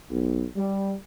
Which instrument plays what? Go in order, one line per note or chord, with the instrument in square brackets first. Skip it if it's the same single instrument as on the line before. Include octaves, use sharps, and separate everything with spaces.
[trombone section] B1
G3